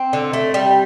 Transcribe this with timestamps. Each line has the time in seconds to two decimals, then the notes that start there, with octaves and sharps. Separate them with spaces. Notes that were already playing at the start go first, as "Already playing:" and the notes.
Already playing: C4
0.13 D3
0.33 A3
0.54 G3